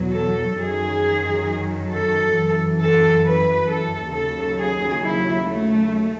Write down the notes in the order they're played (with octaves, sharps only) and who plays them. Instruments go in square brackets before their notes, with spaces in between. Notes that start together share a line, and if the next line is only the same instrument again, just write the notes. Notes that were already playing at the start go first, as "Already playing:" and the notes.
Already playing: [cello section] E2 B2 F#3
A4
F#2 D#3 F#3 G#4
A4
F#2 E3
A4
B4
A4
D#2 C#3 F#3 A4
G#4
E4
A3